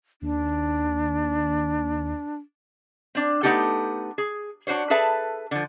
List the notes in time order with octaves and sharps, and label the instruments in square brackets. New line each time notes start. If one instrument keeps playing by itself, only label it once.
[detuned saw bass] D#2 [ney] D4
[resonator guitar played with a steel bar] C4 D4
A3 B3 D#4 G4 A4
G#4
D4 F#4 C5 C#5
G#4 A4 B4 E5 A5
D3 F3